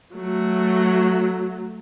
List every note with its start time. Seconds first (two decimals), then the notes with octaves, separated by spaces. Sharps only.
0.14 F#3 A3